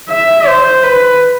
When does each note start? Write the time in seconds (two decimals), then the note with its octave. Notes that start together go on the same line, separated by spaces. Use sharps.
0.10 E5
0.47 C5
0.83 B4